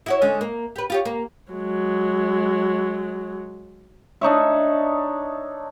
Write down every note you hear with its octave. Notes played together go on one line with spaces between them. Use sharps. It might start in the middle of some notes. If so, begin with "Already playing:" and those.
E4 F#4 C#5
D3 G#3 C#4
A#3
G4 B4
F4 G4 C#5
A#3
F#3 G#3
D4 D#4 C#5 E5